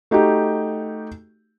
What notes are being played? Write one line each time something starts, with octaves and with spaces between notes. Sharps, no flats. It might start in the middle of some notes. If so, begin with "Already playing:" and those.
A3 D#4 F#4 G4